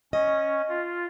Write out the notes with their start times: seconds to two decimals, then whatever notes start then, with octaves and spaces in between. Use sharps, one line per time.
0.13 C#4 D#5
0.69 F4